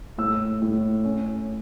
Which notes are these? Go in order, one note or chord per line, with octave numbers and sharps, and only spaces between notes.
A2 E6
A2
C#4